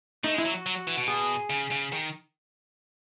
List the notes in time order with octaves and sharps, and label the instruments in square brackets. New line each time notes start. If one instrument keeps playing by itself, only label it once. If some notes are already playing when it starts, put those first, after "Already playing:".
[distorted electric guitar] A3 [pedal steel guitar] D#4
[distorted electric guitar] G#3
[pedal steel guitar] E4
[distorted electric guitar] F#3
[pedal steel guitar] F#4
[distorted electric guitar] F#3
E3
B2
[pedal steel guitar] G#4
[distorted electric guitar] C#3
C#3
D#3